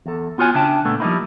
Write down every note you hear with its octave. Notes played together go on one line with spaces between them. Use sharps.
E2 A4
B3 F4 F#4 C#5 G#5
C#3 D4 E5 G5 A5
A#2 A3 B3 D4
F3 G3 A#3 C4 D#4 E4